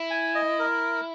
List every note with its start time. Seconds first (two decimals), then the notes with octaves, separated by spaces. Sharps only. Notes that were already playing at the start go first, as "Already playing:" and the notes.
Already playing: E4
0.11 G#5
0.35 D#5
0.59 A#4